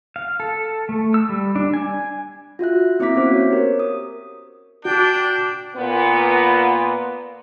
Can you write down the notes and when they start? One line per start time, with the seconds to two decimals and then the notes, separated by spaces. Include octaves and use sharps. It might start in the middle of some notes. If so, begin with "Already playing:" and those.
0.16 F5
0.40 A4
0.89 A3
1.14 E6
1.29 G3
1.56 D4
1.74 G#5
2.59 F4 F#4 E5 F#6
3.00 A#3 C4 E4 E5 D6 B6
3.15 B3 C#4 F#4 C5
3.34 C#5
3.50 G4 A#4
3.80 D#6
4.85 D4 F#4 G5
5.76 A#2 B3